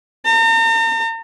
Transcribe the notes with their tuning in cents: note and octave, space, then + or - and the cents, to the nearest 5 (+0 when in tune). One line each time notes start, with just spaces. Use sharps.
A#5 -45